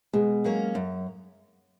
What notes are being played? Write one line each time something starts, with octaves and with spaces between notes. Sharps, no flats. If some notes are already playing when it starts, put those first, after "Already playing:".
B2 G#3
F#3 A#3 C#4
F#2